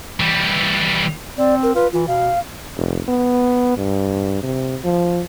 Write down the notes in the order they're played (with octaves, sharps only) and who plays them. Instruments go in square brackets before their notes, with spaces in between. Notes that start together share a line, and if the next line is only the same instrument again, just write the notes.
[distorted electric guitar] E3 G3
[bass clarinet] C4 [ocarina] D5
[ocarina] A#4
[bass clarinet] F4 [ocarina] B4
[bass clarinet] E3 [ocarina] F4
[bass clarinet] B2 [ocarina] F5
[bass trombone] F1
B3
G2
C3
F3